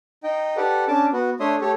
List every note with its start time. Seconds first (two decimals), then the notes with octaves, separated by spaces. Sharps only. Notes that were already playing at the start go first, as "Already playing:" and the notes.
0.24 D#4 D#5 G5
0.57 G4 A4 B4 D5 F#5
0.88 C#4 D4 A5 D6
1.13 B3 F#4
1.40 A3 D4 C#5 E5 C6 D#6
1.61 A3 G4 A4 C#5